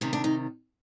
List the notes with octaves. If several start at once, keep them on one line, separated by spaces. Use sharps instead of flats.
C3 D#3 G3 C#4
D4
D#4